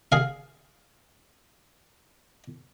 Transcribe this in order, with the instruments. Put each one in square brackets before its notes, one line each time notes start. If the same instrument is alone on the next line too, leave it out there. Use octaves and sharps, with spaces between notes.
[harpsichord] G#4 F5